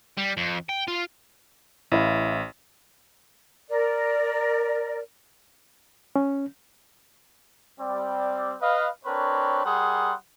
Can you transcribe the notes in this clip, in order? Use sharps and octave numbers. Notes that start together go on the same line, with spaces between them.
G3
F2
G5
F4
A1 E4 F5
A#4 D5
C#4
G3 C4 D5
B4 D#5 F5
C4 D4 A#4 B4 C#5
G3 G#4 A#4 F#5 C6 D#6